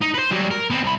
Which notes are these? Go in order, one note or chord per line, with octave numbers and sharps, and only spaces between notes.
D#4
B4 C5
F#3 G3
A#4
B3 C4
C2 B5